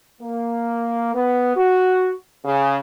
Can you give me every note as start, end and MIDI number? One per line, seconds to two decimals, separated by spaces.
0.21 1.12 58
1.15 1.52 59
1.56 2.11 66
2.45 2.76 49